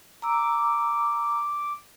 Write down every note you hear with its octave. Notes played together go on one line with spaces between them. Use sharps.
A#5 D6 E6